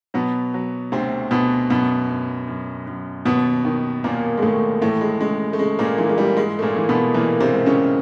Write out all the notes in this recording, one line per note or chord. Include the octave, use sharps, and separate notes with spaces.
B2 F#3 B3
F#3
D2 C3 C4
D2 B2 B3
F#2 B2 B3
F#2
F#2
F#2
D#2 B2 B3
D#3
D#2 A#2 A#3
G#3
D#2 A2 A3
A2 E3 A3
G#3
C#3 G#3
A3
C#3 G#3
A#2 A#3
E3 G#3
G#3
G3
G#2 G#3
A3
A#2 A#3
E3
B2 B3
A#2 E3 A#3
C3 C4
G#2
C#3 C#4